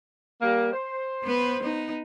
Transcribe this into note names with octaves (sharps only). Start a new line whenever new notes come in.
G3 A#3
C5
B3 B4
B3 D#4